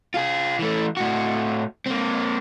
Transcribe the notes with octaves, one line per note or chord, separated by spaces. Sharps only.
F4 G#4
E3 A3
A2 F#4
A#3 C4